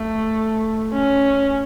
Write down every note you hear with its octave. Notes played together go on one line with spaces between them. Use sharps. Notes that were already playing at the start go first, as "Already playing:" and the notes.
Already playing: A3
C#4